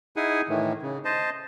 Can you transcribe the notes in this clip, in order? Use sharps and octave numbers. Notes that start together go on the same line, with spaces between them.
D#4 E4 G#4 F#5 G#5
A2 D#3 E3
C#3
C5 D#5 A5